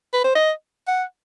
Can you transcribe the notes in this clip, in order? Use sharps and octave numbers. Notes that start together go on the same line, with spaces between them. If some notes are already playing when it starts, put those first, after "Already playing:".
B4
C5
D#5
F#5